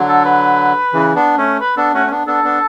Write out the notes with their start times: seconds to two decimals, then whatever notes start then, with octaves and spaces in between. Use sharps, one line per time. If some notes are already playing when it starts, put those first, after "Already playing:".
Already playing: D3 F#3
0.09 A4
0.25 B4
0.93 C#3 E3
1.15 B3 D4
1.37 A3 C#4
1.60 B4
1.77 B3 D4 A4
1.94 A3 C#4 F#4
2.07 C#4
2.10 B3 D4
2.27 B3 D4 A4
2.44 B3 D4